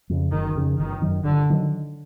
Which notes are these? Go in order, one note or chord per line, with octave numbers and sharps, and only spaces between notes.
F2 C#3
F#1 D#3
F2 C#3
G1 D#3
F#2 D#3 F#3
G1 D3
D#3 F#3